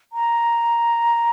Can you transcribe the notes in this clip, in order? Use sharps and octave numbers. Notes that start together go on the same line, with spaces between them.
A#5